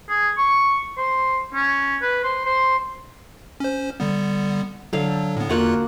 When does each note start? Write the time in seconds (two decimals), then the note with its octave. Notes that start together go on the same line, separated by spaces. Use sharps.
0.09 G#4
0.37 C#6
0.97 C5
1.54 C#4
2.02 B4
2.24 C5
2.45 C5
3.60 C#4 C5
4.00 D3 G3 B3
4.93 D3 F#3 A4 F5
5.36 A2 B3
5.49 E2 A#3 F4 F#4 F#5 F#6